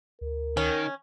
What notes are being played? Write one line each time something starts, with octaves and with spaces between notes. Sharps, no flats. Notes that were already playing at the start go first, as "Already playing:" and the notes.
D2 A#4
D#3 C#4